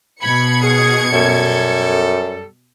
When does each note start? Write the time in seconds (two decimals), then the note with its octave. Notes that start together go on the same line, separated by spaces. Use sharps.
0.22 B2 B5 G#6 C#7
0.61 D#3 F#3 G#4
1.13 F#2 G3 A4